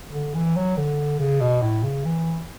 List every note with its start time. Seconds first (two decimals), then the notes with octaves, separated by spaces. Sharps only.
0.12 D3
0.35 E3
0.56 F#3
0.77 D3
1.20 C#3
1.41 B2
1.62 A2
1.83 C#3
2.05 E3